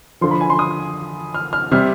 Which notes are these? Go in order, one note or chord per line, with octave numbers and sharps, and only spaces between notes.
D3 F3 C6
B5
G#5
C6
D#6
F6
F6
C3 G3 F6